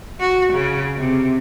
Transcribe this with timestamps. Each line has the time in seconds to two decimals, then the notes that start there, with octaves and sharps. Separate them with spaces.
0.20 F#4
0.54 C#3
0.98 C3